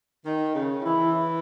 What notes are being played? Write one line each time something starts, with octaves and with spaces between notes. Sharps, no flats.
D#3
C#3
E3 E4